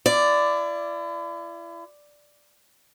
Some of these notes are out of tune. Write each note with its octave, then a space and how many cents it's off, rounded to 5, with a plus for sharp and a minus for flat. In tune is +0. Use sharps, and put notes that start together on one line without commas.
E4 +40 D5 +0